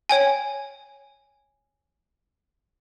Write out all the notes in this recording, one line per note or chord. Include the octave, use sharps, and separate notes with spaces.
C#5 G5 G#5